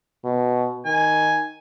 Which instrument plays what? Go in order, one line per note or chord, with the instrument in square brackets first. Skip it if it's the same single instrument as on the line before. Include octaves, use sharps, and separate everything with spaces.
[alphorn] B2
[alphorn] D#3 [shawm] G#5